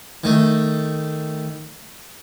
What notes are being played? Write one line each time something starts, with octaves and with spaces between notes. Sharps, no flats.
D#3 A3